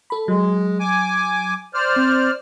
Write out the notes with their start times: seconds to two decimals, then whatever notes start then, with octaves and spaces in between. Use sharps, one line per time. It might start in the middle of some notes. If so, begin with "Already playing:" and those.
0.10 A4 B5
0.28 F#3 G#3
0.80 G#5 D6
1.74 C5 D5 F6
1.96 C4